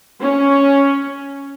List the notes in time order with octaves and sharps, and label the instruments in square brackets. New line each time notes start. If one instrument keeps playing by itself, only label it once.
[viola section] C#4